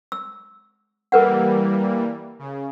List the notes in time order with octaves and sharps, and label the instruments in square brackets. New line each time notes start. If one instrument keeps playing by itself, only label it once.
[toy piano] E6
[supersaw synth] E3 G3 A#3 [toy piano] A#4 B4 F#5
[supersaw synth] C#3